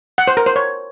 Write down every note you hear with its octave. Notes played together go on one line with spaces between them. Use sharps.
F#5
C5
A#4
C5
C#5